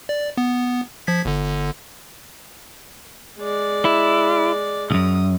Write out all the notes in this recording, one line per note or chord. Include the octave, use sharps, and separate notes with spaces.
D5
B3
F3 G#6 B6
G1 D3
G#3 D5
E4
C#2 F#2 D#6